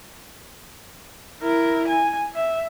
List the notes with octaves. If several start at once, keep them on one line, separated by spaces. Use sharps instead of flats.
E4 A#4
G#5
E5